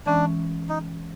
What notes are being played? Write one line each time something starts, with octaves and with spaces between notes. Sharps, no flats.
E3 G#3 C#4 D4
D#4